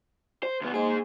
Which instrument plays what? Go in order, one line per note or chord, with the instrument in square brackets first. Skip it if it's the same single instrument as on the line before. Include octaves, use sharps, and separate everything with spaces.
[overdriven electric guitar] C5
D2 B3
[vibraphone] A#3 C5 C6 [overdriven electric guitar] D#4 G#4